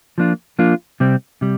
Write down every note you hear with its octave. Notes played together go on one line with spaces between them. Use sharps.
F3 A#3 D4 F4
F3 A#3 D4 F4
C3 G3 C4
C3 G3